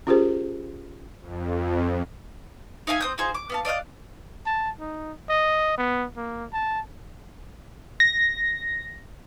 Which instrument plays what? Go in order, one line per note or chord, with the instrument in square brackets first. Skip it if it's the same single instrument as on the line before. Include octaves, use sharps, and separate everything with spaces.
[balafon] C#4 F4 G4 G#4 A#4 C5
[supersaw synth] F2
[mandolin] D#4 E5 F5 G#5
C4 D#6 G6
D#4 F4 G#4 C5
D6
B3 F5 A5
D5 D#5 F5 F#6
[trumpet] A5
D#4
D#5
B3
A#3
A5
[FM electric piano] A#6